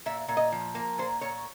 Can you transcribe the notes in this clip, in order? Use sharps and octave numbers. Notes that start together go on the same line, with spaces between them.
A#2 E5
A#2
D#5
F3
A#3
A#2 C5
A#2 C#5